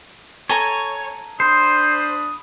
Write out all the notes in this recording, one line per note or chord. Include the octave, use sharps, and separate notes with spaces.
A4 C#5 G#5 A#5
D4 C5 B5 D#6